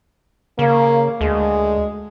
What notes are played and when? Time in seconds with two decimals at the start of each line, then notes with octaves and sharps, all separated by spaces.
0.59 C#3 A#3
1.21 D2 G#3